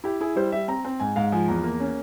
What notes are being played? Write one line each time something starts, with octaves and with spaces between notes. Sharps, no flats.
E4 G4
E4 G#4
G3 C5
G3 E5
C4 A#5
C4
G#2 G#5
G#2 F5
F3 G#5
E2 A#5
A#3
C#4